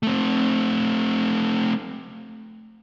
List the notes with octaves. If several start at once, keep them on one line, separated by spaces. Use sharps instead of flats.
A3 C4